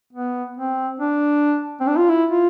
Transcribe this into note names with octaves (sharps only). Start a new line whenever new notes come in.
B3
C4
D4
C4
D4
F4
E4
F4